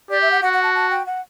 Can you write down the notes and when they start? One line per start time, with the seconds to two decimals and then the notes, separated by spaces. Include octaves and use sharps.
0.10 G4 D5
0.22 E5
0.31 F#5
0.42 F#4 F#5
0.53 F#5
0.63 A5
0.74 A5
0.91 G5
1.06 F#5